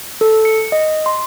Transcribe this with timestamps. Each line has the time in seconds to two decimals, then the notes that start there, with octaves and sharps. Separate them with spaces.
0.21 A4
0.45 C#7
0.72 D#5
1.06 C6